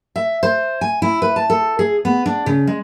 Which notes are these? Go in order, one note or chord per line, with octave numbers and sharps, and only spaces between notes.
E5
C5
G#5
E4
B4
A5
A4
G#4
B3
D4
C#3
G#3